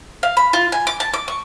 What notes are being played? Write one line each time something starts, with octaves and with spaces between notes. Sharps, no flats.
F5
B5
F4
G#5
D6
A5
D6
C#6